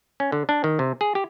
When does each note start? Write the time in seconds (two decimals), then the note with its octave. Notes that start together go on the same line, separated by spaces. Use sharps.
0.20 C#4
0.32 D3
0.49 D4
0.64 D#3
0.79 C3
1.01 G#4
1.15 G4